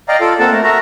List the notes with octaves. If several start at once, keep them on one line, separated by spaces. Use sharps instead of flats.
D5 D#5 F5 G5 A#5
F4 A4 D5
A#3 C4 A4 F#5 A5
A3 A#4
F#4 A#4 E5 A#5